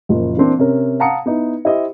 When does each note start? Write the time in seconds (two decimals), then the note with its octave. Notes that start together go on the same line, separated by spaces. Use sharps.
0.09 F#1 A#2 F3
0.37 E3 A#3 C4 D4
0.59 C3 C#4 A#4
1.00 F5 F#5 A5 A#5 D#6 C#7
1.26 B3 D#4 E4
1.65 E4 G4 C5 D#5